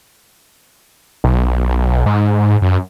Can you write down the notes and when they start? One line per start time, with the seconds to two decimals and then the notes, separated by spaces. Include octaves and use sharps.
1.24 B1
2.06 G#2
2.62 F#2